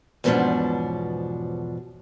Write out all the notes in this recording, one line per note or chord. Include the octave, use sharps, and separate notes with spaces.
E2 G#2 B2 F3 C#4 D4